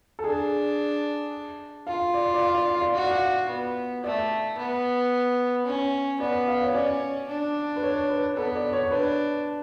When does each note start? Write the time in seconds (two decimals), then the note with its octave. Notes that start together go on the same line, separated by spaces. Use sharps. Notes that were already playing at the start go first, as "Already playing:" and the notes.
0.19 A4
0.24 D4 G#4
1.87 F4 F5
2.14 D5
2.34 D5
2.41 F5
2.54 D5
2.68 F5
2.82 D5
2.95 F#4 D5
3.03 F5
3.11 D5
3.49 B3
4.04 A3 D5
4.58 B3
5.66 C#4
6.20 B3 D5
6.48 F5
6.63 C#5
6.74 C#4 D5
7.28 D4
7.76 B4
7.83 C#5
8.10 B4
8.37 B3 A4
8.56 D5
8.73 C#5
8.91 D4 B4